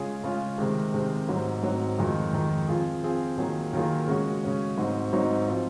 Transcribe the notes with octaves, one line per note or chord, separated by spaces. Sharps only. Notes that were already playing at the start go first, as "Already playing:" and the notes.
Already playing: C#3 G#3 C#4 F4 G#4
C#3 G#3 C#4 F4 G#4
C3 D#3 G#3 C4
C3 D#3 G#3 C4
G#2 F#3 C4
G#2 F#3 C4
F2 D#3 G#3 D#4
F2 D#3 G#3 D#4
F3 C4 F4 G#4
F3 C4 F4 G#4
D#3 F#3 A#3 F4 G#4
D#3 F#3 A#3 F4 G#4
C#3 G#3 C#4 F#4
C#3 G#3 C#4 F#4
G#2 F#3 C4 D#4 F#4
G#2 F#3 C4 D#4 F#4
F3 C4 F4